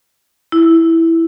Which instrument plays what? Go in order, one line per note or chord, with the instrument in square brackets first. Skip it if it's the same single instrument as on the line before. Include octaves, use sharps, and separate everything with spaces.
[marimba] E4